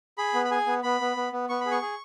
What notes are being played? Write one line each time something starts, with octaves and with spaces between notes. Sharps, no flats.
G#4 B5
B3
B5
G#4 G#5
B3
B3 B5
B3
B3
B3
B3 C#6
G#4 B5
C#6
G#4